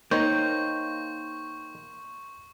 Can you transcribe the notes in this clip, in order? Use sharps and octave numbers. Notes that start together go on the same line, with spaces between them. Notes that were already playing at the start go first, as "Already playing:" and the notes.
D#3 A#3 D#4 C5 C#5 C6 C#6 G6